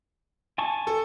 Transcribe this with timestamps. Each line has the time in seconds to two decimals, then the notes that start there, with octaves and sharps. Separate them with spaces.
0.58 G#5 A5 C#6
0.87 A4